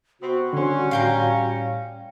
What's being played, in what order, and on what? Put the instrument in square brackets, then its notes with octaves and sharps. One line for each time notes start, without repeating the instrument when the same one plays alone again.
[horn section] C3 B3 C4 [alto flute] F#4
[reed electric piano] D3 C6 [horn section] G3 C#4
[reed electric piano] A2 [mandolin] F5 G5 A#5